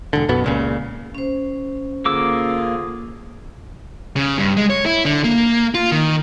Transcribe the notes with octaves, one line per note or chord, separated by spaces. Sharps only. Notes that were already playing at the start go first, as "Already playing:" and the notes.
E1 D3
B1 F#2 B2 B3
C#2 A#2 C#3
C#4 C5
D3 A#3 F4 G#4 D6 E6
C#3
G2
G#3
C#5
E4
D3
A#3
F4
D#3